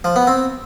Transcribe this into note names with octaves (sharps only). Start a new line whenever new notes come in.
F3
B3
C4